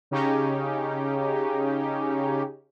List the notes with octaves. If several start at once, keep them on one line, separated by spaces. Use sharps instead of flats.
C#3 C#4 D#4 G4